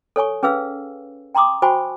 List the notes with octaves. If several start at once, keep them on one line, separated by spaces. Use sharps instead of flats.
A4 C#5 G#5 C#6
C#4 G#4 B4 F5 E6
G5 A#5 C6 D6 D#6
F#4 C5 G5 G#5 B5 C#6